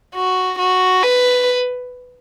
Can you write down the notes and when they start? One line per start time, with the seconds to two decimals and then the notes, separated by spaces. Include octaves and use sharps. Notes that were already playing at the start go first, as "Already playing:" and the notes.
0.15 F#4
0.59 F#4
1.03 B4